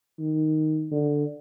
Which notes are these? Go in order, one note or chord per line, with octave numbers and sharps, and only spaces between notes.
D#3
D3